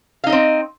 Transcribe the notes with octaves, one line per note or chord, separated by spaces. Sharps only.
C4 D#4 D#5 F5